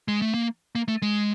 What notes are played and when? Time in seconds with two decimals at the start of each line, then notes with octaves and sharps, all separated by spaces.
0.08 G#3
0.22 A3
0.34 A#3
0.75 A#3
0.88 A3
1.02 G#3